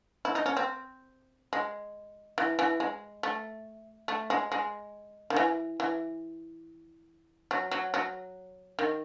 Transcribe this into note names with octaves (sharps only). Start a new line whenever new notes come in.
E4
D#4
C#4
C4
G#3
E3
E3
G#3
A3
A3
G#3
G#3
D#3
E3
E3
F#3
F#3
F#3
D#3